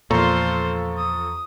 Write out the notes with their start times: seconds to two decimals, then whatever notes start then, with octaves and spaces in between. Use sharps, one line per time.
0.11 E2 A#2 F3 F4 A4 C5 A#5 C#6
0.98 D#6